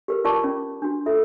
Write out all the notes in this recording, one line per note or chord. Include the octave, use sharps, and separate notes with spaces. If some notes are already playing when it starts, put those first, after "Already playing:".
G4 A#4 B4
F4 A#4 D5 A5 C#6 D6
C#4
D4 F#4
F4 A4 E5